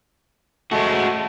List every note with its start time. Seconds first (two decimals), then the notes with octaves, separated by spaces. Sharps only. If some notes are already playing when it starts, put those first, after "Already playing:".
0.71 G#3 A3 F#4